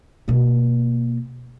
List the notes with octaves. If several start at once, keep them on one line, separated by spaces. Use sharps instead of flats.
B2 A#3